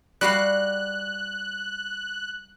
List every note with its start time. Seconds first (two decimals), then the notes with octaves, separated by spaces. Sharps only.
0.21 G3 F#4 F5 F#6